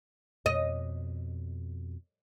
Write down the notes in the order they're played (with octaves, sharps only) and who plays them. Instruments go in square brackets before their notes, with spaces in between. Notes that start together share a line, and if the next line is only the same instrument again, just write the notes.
[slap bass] F2 B2 [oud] D#5